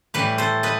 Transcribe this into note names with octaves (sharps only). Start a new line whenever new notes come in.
A2 E3 G3 G4 B4
A4 C5
B4 D#5